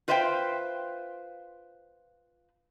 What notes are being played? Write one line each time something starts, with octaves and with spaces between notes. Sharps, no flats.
F4 B4 C5 E5 F5 G5